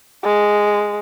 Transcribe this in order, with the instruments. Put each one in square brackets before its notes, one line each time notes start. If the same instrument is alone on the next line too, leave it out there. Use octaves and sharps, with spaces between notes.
[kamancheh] G#3